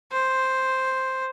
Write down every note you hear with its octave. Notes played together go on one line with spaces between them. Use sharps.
C5